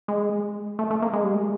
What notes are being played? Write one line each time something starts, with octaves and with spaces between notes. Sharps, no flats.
G#3
A3
A3
A#3
G#3
G3
G#3